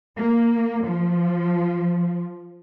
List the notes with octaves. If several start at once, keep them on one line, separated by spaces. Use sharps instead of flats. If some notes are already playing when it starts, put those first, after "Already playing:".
A#3
F3